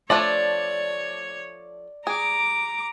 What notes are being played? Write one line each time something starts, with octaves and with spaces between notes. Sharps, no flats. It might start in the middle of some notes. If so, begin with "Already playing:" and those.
F3 A3 D4 C#5 D5 A5
G#4 A#5 D6